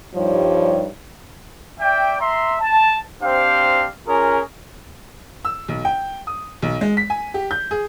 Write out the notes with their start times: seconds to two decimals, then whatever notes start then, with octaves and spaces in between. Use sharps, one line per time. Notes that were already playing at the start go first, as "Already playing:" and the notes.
0.15 G2 F3 G3 D#4 C#5
1.80 D5 E5 G5
2.20 E5 A#5 C6
2.61 A5
3.22 C4 D4 G4 C5 F5
4.07 C#4 F4 G#4 A#4
5.45 E6
5.68 B1
5.85 G5
6.27 D#6
6.62 B1
6.81 G#3
6.97 B6
7.10 G#5
7.34 G4
7.51 G6
7.71 G#4